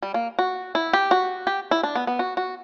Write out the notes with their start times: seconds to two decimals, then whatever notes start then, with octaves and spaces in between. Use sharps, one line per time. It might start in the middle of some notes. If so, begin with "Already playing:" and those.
0.02 G3
0.14 A#3
0.39 F#4
0.75 E4
0.93 G4
1.11 F#4
1.47 G4
1.71 E4
1.83 D4
1.95 B3
2.07 B3
2.19 F#4
2.37 F#4